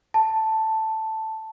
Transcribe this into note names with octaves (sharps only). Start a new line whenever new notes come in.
A5